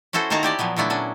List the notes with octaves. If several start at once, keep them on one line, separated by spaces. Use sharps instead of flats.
C#4 E4 F#4 A4 C5
D#3 A#3 F#4 F5 A5 A#5
E4 G4 D5 A5
A#2 F3 F#3 B3
A#2 D3 A3 B3 D4 E4
F#3 C#4 D4